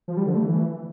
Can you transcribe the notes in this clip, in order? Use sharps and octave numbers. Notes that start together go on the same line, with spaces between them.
F3
G3
D3
A3
E3